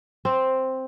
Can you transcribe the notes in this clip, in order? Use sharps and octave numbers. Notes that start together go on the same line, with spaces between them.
C4